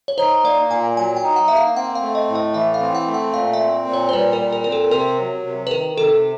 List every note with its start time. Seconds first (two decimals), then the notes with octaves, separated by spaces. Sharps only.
0.08 C#5
0.18 D#4 C5
0.44 A#3 D5
0.70 A#2 G#5
0.97 F#3 G#5
1.16 G5
1.23 D#4
1.36 F#5
1.48 A#3 E5
1.57 F5
1.76 C4 F#5
1.95 F5
2.02 A3
2.15 D#5
2.29 A2
2.35 D#5
2.54 E3 E5
2.74 F5
2.81 C4
2.95 F#5
3.07 A3
3.14 F#5
3.33 A#2 F5
3.53 E5
3.60 C4
3.87 A#2
3.93 C#5
4.09 C5
4.12 G3 B4
4.33 A#4
4.40 A#2
4.52 A#4
4.64 C4 A#4
4.72 A4
4.91 C3 A#4
5.18 F#3
5.44 C3
5.67 B4
5.71 D#3 A#4
5.97 C3 A4